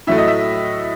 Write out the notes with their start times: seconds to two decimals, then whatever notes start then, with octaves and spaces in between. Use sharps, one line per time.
0.07 A2 F#3 A3 E5
0.17 D#5
0.27 E5